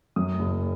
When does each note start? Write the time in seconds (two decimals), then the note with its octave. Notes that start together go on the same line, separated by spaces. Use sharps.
0.16 F#2 D#6
0.39 F#1